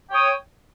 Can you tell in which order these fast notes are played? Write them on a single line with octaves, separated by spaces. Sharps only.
G5 C#5 D#6